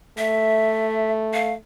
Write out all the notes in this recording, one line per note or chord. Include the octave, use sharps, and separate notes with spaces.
A3 E5
F5